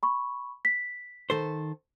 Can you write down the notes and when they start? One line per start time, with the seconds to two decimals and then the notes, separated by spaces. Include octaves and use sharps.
0.03 B5 C#6
0.65 B6
1.30 D#3 A4 C5